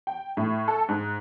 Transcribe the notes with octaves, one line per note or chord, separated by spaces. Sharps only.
G5
A2
A4
G#2